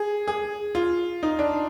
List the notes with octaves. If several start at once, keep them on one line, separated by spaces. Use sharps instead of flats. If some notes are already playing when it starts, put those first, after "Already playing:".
Already playing: G#4
G#4
F4
D#4
D4